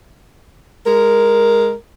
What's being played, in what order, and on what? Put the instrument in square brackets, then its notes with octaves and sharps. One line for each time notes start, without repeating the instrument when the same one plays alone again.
[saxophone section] G#3 A#4